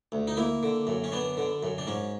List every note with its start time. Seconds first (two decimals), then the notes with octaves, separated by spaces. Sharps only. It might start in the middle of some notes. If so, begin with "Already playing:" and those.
0.12 D2
0.28 D#4
0.37 A#3 E4
0.63 D3
0.87 F#2
1.04 C#4
1.12 B3 D4
1.37 D3
1.63 F#2
1.78 D4
1.87 G#2 C#4